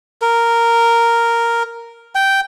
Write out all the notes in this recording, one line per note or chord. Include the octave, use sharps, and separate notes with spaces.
A#4
G5